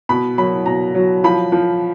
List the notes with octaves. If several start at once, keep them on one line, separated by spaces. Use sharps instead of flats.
B2 B5
F#3 B5
B2 A#5
F#3
F3 B5
F3